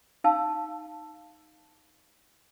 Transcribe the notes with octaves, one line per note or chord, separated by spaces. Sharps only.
D#4 F5 A5 E6